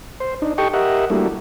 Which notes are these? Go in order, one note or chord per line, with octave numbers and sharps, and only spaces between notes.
C5
D4 D#4
G4 A4 D#5 G5 C#6
G4 A#4 D#5 E5 F#5
G3 A3 A#3 D4 E4 F#4